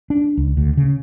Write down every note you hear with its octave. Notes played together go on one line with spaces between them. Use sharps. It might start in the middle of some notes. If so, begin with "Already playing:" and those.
D4
C#2
D2
C#3